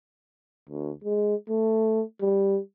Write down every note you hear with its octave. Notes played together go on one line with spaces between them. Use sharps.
D2
G#3
A3
G3